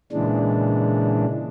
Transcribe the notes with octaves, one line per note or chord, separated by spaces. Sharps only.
A#2 C#3 E3 G#3 D4